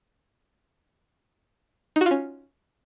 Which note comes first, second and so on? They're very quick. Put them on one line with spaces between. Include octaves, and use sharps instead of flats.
D#4 F#4 F4 C#4